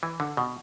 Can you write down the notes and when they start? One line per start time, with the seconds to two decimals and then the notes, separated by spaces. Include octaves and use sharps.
0.03 E3
0.20 D3
0.37 B2